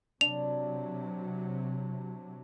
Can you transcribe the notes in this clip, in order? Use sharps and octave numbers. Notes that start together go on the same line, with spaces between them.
C3 F#3 D4 F7